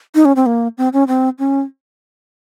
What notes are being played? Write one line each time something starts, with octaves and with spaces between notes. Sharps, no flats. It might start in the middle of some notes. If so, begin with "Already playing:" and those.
D#4
C#4
C4
A#3
C4
C#4
C4
C#4